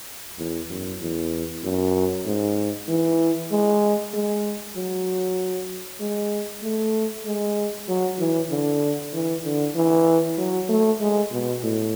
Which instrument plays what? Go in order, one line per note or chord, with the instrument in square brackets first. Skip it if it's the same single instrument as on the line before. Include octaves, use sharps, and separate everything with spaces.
[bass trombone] E2
F#2
E2
F#2
G#2
E3
G#3
G#3
F#3
G#3
A3
G#3
F#3
E3
D3
E3
D3
E3
F#3
A3
G#3
B2
A2